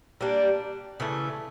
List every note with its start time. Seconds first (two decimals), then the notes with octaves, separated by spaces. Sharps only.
0.21 G3 A#3 D4
1.00 C#3 E3 A3